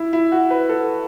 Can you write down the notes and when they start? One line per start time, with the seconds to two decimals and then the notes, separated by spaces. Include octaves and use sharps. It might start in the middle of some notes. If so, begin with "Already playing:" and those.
Already playing: E4
0.13 E4
0.32 F#4
0.50 B4
0.69 A4